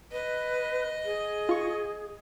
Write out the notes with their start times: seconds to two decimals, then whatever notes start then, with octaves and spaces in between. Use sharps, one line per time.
0.12 B4 D#5
1.05 G#4
1.49 F4 C#6